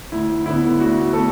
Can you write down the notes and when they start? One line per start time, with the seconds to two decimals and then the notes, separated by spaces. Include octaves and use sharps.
0.12 D2 E4
0.46 D3 B3 E4
0.79 D2 F#4
1.13 A3 B3 A4